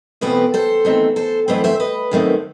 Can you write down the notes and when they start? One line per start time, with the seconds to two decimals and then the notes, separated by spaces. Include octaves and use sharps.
0.21 E2 B2 A3 C4 G4 B4
0.54 A4 C5
0.85 E2 D#3 A3 C4
1.16 A4 C5
1.48 F#2 E3 A3 C4 B4 D#5
1.64 C5 E5
1.80 B4 D#5
2.11 F#2 D#3 A3 C4